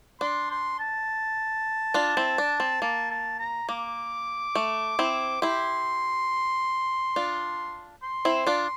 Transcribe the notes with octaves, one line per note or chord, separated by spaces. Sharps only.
D4 C6
C6
A5
D4 F4
C4 E4
D4
C4
A#3 A5
A5
A#5
A#3 D6
A3
C4 E4
E4 G4 C6
D4 F4
C6
C4 E4
D4 F4